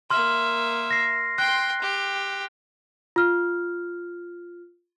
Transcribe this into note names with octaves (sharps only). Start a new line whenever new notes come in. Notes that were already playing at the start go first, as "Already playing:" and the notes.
A#3 E5 C6 F6
A#6 C7
G5 C6 F#6
G4
F4 F6